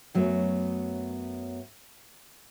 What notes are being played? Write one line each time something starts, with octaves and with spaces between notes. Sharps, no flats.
F#2 F#3 A3 B3